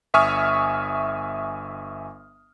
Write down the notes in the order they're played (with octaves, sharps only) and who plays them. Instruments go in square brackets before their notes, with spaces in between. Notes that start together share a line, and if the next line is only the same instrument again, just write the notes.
[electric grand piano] G1 E5 G#5 C#6 D#6 F6